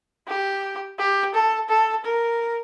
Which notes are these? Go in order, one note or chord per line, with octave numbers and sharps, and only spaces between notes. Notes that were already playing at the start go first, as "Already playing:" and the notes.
G4
G4
A4
A4
A#4